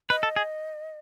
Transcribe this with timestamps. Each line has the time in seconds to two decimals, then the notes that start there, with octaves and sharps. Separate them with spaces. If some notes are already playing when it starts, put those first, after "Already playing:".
0.10 B4 D#5
0.23 A4
0.36 G#4